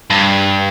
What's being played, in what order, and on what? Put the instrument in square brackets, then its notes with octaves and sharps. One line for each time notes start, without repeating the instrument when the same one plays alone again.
[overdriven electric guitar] G2